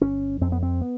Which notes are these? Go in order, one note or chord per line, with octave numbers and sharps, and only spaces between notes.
G1 C#4
F2 C4
B3
C4
B3